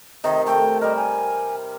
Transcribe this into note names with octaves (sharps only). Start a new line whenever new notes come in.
C3 D#3 D#5
A3 G5
G3 A#4 D#5
G#5